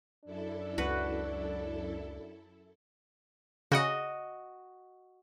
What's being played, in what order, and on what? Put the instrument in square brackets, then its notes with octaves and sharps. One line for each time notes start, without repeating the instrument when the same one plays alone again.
[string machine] F#2 E4 A4 [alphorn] D4
[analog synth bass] C#2 [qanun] F#4 B4
[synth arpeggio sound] C#3 F#5 [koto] F#4 D#5